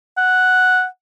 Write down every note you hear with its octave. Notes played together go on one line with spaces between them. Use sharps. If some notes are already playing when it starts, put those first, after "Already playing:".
F#5